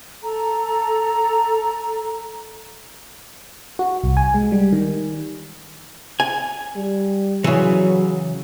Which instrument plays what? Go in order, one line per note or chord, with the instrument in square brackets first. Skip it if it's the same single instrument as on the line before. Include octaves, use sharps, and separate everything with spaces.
[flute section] A4 A#5
[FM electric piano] F#4
C2
G#5
G#3
G3
D#3
[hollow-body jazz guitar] G#5
[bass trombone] G3
[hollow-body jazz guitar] C#3 E3 [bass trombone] F#3